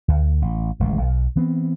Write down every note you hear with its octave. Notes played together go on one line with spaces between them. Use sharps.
D2
A1
D1 A1 D#2 G#3
B1
E3 B3 C4